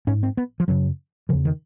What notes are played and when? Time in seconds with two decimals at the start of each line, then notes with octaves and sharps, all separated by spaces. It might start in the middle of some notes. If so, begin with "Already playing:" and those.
0.07 G#2 C#4
0.23 C4
0.37 B3
0.60 F3
0.68 F#2 C#3 F#3
1.29 E2 C#3 F3
1.45 D#3